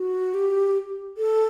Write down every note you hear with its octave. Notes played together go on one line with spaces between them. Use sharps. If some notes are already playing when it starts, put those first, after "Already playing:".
Already playing: F#4
G4
A4